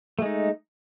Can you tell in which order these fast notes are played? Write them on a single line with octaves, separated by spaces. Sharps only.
A3 G#3 D#4